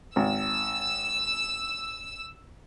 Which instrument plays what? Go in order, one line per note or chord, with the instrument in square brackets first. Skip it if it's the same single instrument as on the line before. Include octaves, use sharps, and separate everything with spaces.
[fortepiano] G#1 [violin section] E6